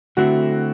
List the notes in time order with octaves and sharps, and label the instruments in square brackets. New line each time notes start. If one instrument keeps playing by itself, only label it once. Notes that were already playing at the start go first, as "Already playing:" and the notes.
[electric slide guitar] D3 A3 C4 E4 [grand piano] F#4